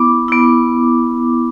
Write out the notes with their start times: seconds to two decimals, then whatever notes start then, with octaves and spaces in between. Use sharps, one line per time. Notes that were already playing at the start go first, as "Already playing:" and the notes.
Already playing: B3 E4 D6
0.28 B3 E4